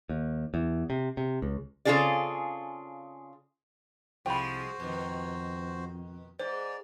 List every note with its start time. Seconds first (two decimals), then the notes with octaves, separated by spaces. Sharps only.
0.09 D#2
0.54 E2
0.90 C3
1.17 C3
1.42 C#2
1.85 C#3 C4 F4 G#4 A4 D5
4.26 C2 F3 G#3 F#4 C5 G5 B5
4.80 F2 B2 D#3
6.39 G#2 C5 D5